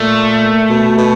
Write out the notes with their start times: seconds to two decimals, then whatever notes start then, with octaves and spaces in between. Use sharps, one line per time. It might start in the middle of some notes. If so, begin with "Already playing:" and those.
Already playing: A#2 A3
0.69 B2
0.98 B2